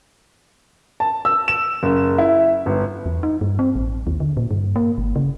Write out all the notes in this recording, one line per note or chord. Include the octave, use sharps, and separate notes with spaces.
A5
E6
E7
F#1
E4
G1
E2
D#4
G2
C4
A1
D#2
D3
A#2
G2
A#3
G1
C#3